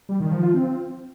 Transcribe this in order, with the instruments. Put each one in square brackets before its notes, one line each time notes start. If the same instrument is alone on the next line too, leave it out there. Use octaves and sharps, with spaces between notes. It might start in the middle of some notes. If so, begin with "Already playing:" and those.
[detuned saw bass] G3
D#3
F3
F4
C4